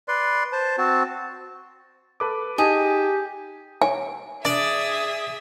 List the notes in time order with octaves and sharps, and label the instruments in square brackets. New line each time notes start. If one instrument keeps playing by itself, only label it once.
[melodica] B4 D5 C6
C5 A5
C4 F#4 A5
[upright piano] A4 B4 D6
[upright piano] D#4 G#5 A5 [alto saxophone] G4 [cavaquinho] G#4
[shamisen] C#5 [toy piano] G#5
[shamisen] D4 [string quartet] G#4 E5 D#6 [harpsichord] D5